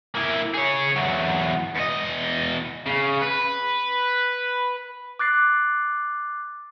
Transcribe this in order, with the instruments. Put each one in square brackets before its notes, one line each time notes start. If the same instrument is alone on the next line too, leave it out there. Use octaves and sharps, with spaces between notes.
[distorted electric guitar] A#3 E4
G#4 C#5
E2 F#3
E2 D#5
C#3
B4
[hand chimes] D6 F#6 A6 C7